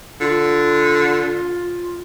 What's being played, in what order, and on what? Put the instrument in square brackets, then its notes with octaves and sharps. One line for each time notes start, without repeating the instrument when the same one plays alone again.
[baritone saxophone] D3 [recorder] F4